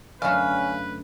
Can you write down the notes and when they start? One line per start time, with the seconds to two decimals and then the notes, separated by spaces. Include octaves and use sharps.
0.22 F#2 D3 A3 C#4 B4 F5